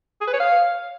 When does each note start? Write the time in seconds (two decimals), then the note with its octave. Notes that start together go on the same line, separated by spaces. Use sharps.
0.21 G#4
0.27 B4
0.33 C#5
0.39 F5